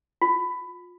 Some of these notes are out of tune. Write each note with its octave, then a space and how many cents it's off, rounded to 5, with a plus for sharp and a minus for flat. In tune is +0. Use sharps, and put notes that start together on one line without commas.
F4 +25